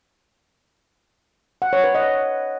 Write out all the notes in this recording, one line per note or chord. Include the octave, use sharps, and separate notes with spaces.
F#5
C#5
B4
D#5